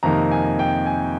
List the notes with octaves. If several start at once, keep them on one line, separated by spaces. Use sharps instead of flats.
F2 C3 D#3 A#3 D#4 A#5
G#5
G5
G#5